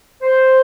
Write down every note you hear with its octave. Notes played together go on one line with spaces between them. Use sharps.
C5